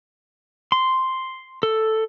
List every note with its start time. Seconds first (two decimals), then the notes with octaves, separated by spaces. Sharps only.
0.72 C6
1.63 A4